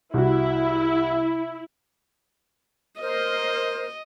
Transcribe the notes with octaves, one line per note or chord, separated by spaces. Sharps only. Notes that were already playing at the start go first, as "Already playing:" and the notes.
C2 E4 F#4
A#4 C5 D#5 F6